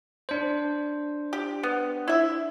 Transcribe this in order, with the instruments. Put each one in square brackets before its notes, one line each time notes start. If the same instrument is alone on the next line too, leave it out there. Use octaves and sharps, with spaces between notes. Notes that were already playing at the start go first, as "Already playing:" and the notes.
[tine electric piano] D4 C5
[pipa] G4
B3
E4 E5